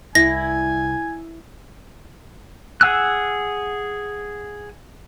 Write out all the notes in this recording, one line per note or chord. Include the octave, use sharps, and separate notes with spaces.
C2 E4 G#5 A#6
G#4 F#5 G#5 E6 F#6